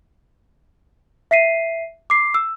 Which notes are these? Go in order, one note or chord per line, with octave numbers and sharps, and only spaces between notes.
E5 B6 C7 D#7
D6 C7
E6